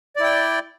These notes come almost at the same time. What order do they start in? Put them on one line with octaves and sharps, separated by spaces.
D5 E4 G5